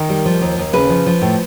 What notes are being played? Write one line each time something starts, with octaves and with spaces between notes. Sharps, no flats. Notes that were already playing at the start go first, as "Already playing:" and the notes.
Already playing: D#3 A#4
G3
F3
D#2
D#2
C#3 B4
F3
F3
A2